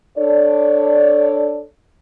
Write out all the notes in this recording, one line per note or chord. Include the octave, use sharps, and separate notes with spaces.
D4 A4 C#5 D5